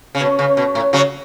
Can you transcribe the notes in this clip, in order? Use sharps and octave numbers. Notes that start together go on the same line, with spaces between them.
C#3
B2
C#3
B2
A2
C#3 F#3